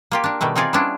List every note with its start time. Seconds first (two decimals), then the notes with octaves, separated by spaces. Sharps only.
0.11 A#3 F4 G4
0.24 D4 A#4
0.41 B2 D#3 G3 A3
0.56 C4 D#4 F4 G#4 A#4 D5
0.73 G3 B3 C#4 D4 E4 F4